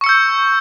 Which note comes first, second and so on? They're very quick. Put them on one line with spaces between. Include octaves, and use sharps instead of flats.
C#6 C#7 E6 G6